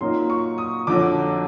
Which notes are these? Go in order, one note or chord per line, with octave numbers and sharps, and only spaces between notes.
A#2 F#3 A#3 D#4 C6
C#6
D#6
F2 D3 F#3 D6